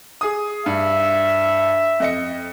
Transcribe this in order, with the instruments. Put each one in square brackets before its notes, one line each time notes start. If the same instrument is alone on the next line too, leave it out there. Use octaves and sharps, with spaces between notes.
[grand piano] G#4 D#6
[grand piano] G2 [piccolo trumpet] E5
[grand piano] F2 D#5 C#7